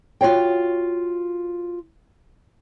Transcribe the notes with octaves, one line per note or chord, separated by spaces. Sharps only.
F4 F#4 C#5 G5